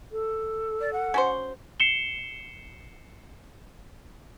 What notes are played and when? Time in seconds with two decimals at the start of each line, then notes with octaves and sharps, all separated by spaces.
0.12 A4
0.81 D5
0.93 F#5
1.14 C#4 F#4 C5
1.80 C7 C#7 E7 G7